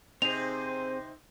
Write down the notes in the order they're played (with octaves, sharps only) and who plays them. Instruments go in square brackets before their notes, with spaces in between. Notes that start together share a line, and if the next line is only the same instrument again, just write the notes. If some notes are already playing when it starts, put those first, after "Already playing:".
[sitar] C3 D#4 [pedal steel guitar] C4 G#4 [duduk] C5 [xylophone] F7